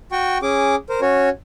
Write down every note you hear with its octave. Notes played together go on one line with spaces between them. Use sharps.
F#4 G5 C#6
C#4 G#4 D6
A#4 C5
C#4 F#4 C#5